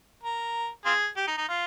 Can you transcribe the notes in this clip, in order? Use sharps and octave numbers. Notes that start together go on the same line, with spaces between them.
A#4
C4 F4 G#4
G4
D#4
D#4
F4